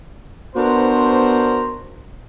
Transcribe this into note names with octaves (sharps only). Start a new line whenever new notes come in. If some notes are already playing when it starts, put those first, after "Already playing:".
B3 D4 F#4 A#4 C5